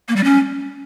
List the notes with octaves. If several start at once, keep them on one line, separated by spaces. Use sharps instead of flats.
A#3
G3
C#4